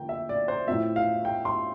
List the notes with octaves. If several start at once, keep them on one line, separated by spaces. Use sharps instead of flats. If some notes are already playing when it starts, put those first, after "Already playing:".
Already playing: D3 F3 A#3 G5
E5
D5
C5
A2 F3 C4 E5
F5
G5
C6